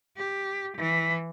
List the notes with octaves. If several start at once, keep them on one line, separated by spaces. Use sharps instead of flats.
G4
E3